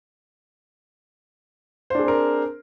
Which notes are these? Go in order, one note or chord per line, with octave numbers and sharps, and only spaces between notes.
C4 D4 G#4 A#4 C5